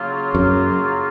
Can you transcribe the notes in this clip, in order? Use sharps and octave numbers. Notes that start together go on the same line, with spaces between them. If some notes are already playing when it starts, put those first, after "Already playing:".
Already playing: C#3 F#3 A#3 F4
F#2